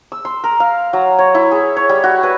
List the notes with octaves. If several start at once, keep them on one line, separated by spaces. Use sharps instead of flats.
E6
C6
A#4
F5
F#3
C#5
E4
G#4
C#5
G3
F#4
B4